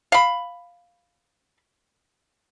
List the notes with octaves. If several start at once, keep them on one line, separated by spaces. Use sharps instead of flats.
F5 B5